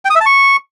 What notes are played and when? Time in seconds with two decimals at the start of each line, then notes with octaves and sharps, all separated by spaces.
0.05 G5
0.10 D#6
0.15 E5
0.21 A5
0.26 C#6